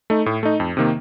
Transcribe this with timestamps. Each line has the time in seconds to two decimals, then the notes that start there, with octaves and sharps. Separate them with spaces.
0.10 A3 D#4
0.26 A2
0.43 A3 D#4
0.60 F2
0.77 C3 D#3 A#3